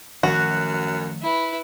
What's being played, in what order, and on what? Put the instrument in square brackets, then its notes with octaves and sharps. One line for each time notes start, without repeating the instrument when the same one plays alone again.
[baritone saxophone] F#2 [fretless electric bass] D#3 F3 A3 [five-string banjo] F#4
[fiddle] E4 B4